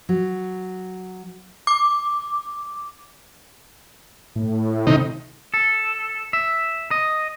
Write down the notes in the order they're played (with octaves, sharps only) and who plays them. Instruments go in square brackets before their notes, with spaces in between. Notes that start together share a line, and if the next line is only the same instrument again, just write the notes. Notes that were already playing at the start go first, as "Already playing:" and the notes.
[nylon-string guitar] F#3
[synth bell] D6
[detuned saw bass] A2
[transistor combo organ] C3 D#3 D#4
[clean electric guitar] A4
E5
D#5